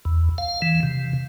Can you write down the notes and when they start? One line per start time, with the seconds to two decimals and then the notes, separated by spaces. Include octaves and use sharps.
0.05 E2
0.38 F5
0.62 E3
0.83 C3